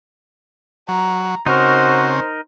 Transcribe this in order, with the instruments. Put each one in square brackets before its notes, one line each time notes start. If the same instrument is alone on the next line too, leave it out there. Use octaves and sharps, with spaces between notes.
[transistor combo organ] F#3 [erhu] A#5
[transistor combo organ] C#3 C4 [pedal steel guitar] D#4 A#4 [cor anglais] F#4 [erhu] C5